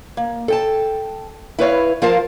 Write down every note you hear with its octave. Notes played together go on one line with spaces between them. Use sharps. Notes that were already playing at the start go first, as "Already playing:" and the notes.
A#3
A4 G5 A5
E4 B4 C#5 F5
F3 F4 A#4 C5 F5 A5